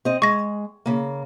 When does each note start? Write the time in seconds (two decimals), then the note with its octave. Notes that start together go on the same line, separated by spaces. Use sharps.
0.05 C4 D#5
0.22 G#3 C#6 A#6
0.86 C#3 A#3